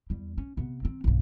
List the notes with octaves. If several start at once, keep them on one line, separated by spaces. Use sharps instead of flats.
E2 G3
C#4
C3 B3
D#3 C4
B1 G2